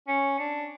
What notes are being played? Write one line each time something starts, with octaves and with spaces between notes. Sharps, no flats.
C#4
D4